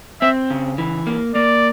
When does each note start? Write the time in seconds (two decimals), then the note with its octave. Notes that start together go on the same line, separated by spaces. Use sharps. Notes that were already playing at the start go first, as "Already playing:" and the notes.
0.22 C4 E5
0.50 C#3
0.78 E3
1.07 A#3
1.35 A#3 D5